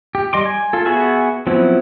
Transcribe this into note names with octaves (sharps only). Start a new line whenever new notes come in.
G4
G3 D#5 C6 D6
G#5
F4 A4
B3 F#4 G#4 E5 G#5
F3 F#3 B3 C4 E4